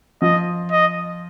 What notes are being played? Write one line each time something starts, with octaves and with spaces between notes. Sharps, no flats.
F3 F4 D#5
D#5